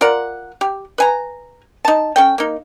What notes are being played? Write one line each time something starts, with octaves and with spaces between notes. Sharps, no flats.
F4 A#4 D5 F#5
G4
B4 G#5 A#5
D#4 A5
C#4 A4 G5
A#3 D#4